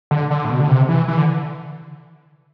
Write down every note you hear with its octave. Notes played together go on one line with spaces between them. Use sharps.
D3
D3
A2
B2
D3
C3
E3
E3
D3